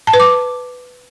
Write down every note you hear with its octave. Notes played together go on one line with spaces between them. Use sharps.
A5
B4
D6